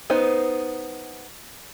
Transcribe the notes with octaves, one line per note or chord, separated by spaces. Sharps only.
B3 D#4 C5